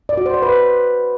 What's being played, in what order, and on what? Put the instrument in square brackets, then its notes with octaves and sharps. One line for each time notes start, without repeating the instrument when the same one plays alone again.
[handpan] D5
F#4
C5
D5
B4